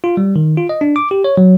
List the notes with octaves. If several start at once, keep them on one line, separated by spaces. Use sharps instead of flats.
F4
G3
D#3
F4
D#5
D4
D6
G4
C#5
F#3